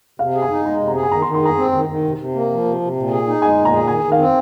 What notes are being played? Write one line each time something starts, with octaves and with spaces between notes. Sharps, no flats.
C3 F5
G#4
G#5
D#4
G#3 A#5
C3
A#5
G#4
G#5
D#3 A#5
C6
D#3
C6
G#4 A#5
C4
D#3
D#3
C3
C3
A#3
F3
C3
C3
A#2
G#4
D#4
G#3 G#5
A#2
A#5
G#4
D#3 G#5
D#3
F5
C4